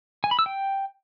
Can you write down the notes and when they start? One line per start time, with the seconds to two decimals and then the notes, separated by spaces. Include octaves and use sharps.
0.24 G#5
0.31 B5
0.39 E6
0.46 G5